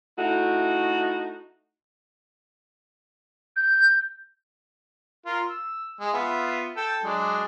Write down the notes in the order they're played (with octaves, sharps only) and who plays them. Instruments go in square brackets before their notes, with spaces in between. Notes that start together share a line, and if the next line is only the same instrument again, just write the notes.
[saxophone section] A3 D#4 E4 F#4
[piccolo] G6
[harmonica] F4 A#4
E6
G#3
B3 F4 E5
A4 G5
F#3 G#3 D4